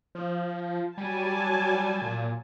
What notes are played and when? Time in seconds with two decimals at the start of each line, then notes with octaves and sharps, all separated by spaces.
0.15 F3
0.97 F#3 G3 G#5 A5
2.02 A#2